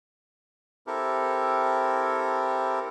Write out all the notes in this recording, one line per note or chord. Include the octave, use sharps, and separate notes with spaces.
C4 E4 G4 A4 A#4